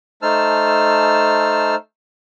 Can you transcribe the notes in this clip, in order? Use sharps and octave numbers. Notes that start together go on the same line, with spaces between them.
A3 D#4 C5 A5 E6 F6